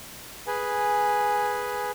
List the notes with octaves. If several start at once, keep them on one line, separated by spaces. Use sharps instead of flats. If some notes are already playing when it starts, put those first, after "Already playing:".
G#4 B4 G#5